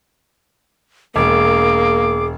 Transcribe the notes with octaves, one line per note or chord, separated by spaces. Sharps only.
E1 A#3 G#4 D6